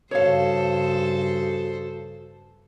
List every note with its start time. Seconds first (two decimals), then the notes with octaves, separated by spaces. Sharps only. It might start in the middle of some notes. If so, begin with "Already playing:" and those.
0.11 G2 C#3 F#4 A4 C5 C#5 F5